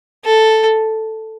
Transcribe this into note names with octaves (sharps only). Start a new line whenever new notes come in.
A4